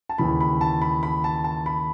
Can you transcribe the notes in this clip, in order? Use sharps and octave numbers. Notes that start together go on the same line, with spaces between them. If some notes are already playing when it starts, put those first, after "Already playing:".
A5
D#2 C#3 E3 B5
B5
A5
B5
B5
A5
A5
B5